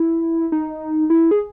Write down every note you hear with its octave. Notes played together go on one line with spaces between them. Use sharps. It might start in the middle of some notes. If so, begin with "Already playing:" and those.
Already playing: E4
D#4
E4
G#4